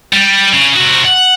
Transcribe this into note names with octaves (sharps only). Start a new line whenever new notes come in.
G3
C#3
C3 F#4
F#5